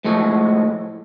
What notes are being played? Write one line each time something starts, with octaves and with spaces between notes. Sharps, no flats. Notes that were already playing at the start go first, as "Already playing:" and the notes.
A2 F3 G#3 A3